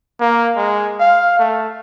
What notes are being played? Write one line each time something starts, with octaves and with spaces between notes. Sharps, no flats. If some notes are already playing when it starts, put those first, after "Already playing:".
A#3
G#3
F5
A3